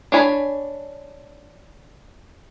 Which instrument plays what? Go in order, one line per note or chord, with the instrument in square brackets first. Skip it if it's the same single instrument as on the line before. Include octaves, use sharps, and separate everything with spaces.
[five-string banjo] D4 C#5 G#5 A#5 B5